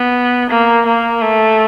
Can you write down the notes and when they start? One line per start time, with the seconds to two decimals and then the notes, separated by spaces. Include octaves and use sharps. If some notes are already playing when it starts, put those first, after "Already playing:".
Already playing: B3
0.50 A#3
0.86 A#3
1.21 A3